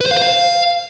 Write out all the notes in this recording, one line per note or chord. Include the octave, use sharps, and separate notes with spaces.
B4
C5
F5
C5
F5